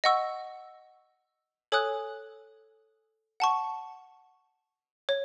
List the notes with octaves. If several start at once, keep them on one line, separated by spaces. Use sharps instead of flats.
D#5 F#5 C#6 E6
A4 C#5 G#5 D#6 F#6
F#5 A5 C#6
C#5